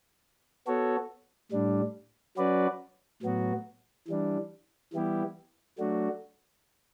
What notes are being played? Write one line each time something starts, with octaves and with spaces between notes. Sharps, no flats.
B3 F#4 A4 C#5
A2 G3 D4
F#3 C#4 F#4 B4 D5
A2 F#3 B3 F#4
E3 G3 D4
E3 G3 B3 E4 G4
F#3 A3 D4 F#4